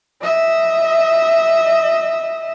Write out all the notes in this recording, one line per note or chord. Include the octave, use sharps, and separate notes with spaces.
D#5 E5